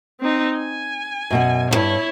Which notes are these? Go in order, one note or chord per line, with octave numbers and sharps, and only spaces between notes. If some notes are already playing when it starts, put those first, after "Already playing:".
C4 D#4
G#5
F#2 B2 F#5
D2 G2 E4 C#5